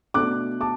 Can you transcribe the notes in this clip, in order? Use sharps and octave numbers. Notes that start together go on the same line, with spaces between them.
B2 A3 D4 D6 F#6
A5 D6